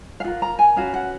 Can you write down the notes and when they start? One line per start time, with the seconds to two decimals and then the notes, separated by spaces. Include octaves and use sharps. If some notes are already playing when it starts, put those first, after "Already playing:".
0.20 F5
0.24 F4 A#4 F#5
0.42 A#5
0.59 G#5
0.76 C#4 F#4 B4 F5
0.94 F#5